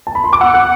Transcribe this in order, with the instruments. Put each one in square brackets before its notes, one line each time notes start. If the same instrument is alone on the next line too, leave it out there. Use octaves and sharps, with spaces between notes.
[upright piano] A5
B5
C6
D6
[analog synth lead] F#5 [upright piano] E6
[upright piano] F#6